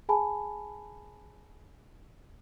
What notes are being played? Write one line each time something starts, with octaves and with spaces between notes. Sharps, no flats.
G#4 G#5 A5 B5